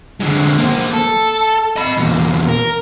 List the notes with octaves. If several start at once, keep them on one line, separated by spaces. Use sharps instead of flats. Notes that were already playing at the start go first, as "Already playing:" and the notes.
D3 G#3
A#3 C5
A4
D#5 B5
E2 A#2
A#4